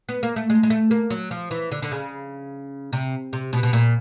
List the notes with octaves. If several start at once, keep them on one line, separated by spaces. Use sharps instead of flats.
B3
A#3
A3
G#3
G#3
A3
A#3
F#3
F3
E3
D3
D3
C#3
C3
C3
B2
B2
A#2